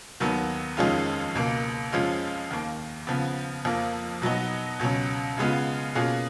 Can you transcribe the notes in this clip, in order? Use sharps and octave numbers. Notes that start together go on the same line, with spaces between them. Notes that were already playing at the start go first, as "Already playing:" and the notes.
D#2 D#3 F#3 B3
F2 D#3 G#3 C#4 F4
C#2 B2 A#3
F2 F3 G#3 C#4 F4
D#2 D#3 A#3
C#3 F3 B3
F2 F3 A#3
B2 F#3 B3 D#4 F#4
C#2 B2 F#3 C#4
C#3 G#3 B3 F4
B2 A#3 C#4 F4 G#4